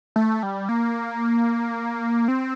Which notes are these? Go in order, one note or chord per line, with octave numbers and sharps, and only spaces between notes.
A3
G3
A#3
C4